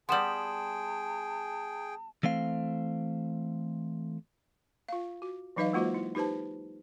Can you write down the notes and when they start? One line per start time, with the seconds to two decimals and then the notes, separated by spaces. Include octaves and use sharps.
0.09 G3 B3 G#4 G5 A5 C6 E7 F#7
2.23 E3 A3 C4 F5
4.89 F4 F5
5.22 F#4
5.56 E3 F#3 D#4 B4 D#5 F5
5.73 G#3 A#3 F4 F#4 C5
5.95 E4
6.15 D#4 G4 B4 C5 A5